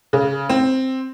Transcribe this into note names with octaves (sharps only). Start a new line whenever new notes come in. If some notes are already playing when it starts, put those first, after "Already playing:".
C#3
C4